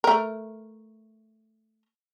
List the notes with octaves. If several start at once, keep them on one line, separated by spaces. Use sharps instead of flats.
A3 A#4